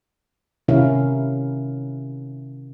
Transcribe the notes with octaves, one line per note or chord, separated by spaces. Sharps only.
C3 D#3 C#4 E4 A#4 F5